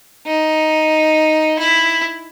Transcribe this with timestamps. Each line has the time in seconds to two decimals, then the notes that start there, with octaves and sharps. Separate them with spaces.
0.27 D#4
1.59 E4